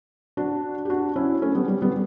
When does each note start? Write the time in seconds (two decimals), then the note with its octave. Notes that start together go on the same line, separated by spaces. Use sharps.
0.37 D4 F#4
0.85 G4
0.90 D4 F#4
1.16 C#4 E4
1.42 A3 C#4
1.55 G3 B3
1.68 G3
1.82 G3 B3